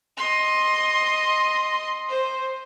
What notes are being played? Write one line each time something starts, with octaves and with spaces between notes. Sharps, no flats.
D#5 C6
C5